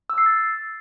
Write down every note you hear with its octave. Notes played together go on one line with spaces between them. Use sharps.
E6
C7
A6